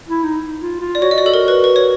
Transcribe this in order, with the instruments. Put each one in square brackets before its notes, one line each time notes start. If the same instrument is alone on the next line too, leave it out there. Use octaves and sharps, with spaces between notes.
[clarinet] E4
D#4
F4
F4
[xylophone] D5
[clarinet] F#4 [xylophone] C#5
[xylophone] D#5
D5
A4
A#4
B4
B4
C#5